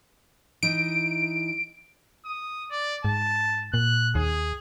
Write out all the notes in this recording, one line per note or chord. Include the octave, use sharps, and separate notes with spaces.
E3 D#4 D7
D#6
D5
G#2 A5
A#2 F#6
D#2 G#4